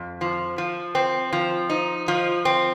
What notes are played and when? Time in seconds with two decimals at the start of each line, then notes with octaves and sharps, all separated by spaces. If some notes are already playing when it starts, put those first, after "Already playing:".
Already playing: F2
0.21 F3
0.58 F3
0.95 C4
1.33 F3
1.70 D#4
2.08 F3
2.45 C4